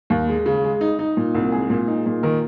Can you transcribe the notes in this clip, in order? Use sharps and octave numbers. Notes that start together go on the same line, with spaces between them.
D#2
G#3
C#3
G#3
D#4
D#4
A#2
C2
G#3 G#4
A#2
D#4
A#2
D#3 A#4